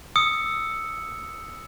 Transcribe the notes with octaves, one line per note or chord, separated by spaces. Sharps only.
D#6 E6 C#7